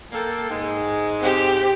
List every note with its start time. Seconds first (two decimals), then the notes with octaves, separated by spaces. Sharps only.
0.12 A#3 A4 G5
0.49 G#2 G#3
1.21 C4 G4